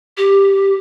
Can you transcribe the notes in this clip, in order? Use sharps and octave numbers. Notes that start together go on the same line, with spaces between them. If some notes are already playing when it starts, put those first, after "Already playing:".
G4